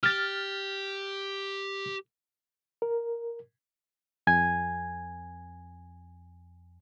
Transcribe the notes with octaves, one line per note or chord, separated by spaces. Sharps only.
G4 F6 A6
A#4
F2 G#5 G#6